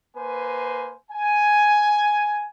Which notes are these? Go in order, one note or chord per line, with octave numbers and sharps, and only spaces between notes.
A#3 B4 C5 G#5
G#5